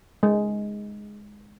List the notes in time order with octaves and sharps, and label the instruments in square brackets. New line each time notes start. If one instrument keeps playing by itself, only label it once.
[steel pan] G#3